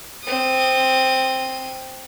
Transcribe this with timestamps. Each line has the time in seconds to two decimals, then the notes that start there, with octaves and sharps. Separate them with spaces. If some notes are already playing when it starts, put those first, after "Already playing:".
0.24 C4 D#6